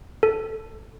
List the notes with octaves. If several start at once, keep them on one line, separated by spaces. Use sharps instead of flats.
A4